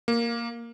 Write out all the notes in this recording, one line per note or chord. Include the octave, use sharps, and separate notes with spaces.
A#3